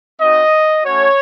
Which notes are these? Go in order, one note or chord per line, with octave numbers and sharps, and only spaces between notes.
C4 D#4 F#4 D#5
A3 C#4 F#4 C#5